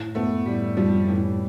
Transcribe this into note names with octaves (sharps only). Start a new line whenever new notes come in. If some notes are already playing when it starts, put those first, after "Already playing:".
Already playing: A2
A3 B3
A2 G3
F3 G3
A2 E3